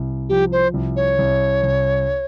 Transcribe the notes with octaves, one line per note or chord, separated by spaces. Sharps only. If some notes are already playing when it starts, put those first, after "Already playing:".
Already playing: C2
F3 G4
C5
C2
C#5
C2
C2